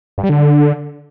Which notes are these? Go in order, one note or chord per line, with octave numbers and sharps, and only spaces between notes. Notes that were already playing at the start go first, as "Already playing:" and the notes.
G2
G3
D3